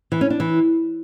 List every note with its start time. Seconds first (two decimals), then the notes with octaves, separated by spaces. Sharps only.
0.12 E3
0.21 C#4
0.30 D4
0.40 E3